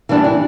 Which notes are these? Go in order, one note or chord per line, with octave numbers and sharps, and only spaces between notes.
E3 G3 D4 G4
E3